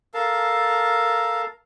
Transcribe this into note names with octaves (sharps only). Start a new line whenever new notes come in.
A4 A#4 F5 A5